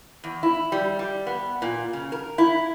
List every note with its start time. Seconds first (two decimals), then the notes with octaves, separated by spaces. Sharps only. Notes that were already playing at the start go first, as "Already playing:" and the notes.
0.24 E2
0.43 E4
0.72 G3
0.99 G3
1.27 B3
1.62 A#2
1.93 C#3
2.12 A#4
2.38 E4